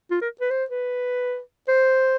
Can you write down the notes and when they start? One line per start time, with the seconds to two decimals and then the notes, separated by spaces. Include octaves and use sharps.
0.11 F4
0.21 A#4
0.41 B4
0.51 C5
0.70 B4
1.68 C5